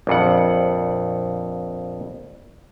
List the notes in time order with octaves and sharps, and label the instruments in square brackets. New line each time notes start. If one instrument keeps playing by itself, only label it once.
[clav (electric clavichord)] A#1 F2 F#5